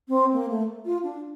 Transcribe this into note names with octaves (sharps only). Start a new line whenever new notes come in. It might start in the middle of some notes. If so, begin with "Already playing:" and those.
C4
A#3
A3
F4
D4